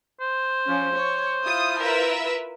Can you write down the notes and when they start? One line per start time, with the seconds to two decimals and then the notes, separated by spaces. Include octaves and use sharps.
0.21 C5
0.67 F3 C#4
0.95 C#5
1.44 E4 F4 D#6
1.81 A#4 B4 E5